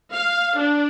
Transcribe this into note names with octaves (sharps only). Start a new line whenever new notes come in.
F5
D4